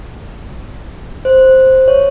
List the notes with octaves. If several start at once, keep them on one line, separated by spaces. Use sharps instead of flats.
C5
C#5